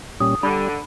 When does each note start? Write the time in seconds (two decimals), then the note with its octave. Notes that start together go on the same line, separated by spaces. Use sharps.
0.20 A#2 G3 C#4 D#6
0.43 D3 G3 D4 B5